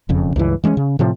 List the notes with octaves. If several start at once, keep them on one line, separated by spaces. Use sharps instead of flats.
E1 F2 C#3
C#2 G2 E3
E3 G#3 C4 C#4
C#3
A2 C3 F3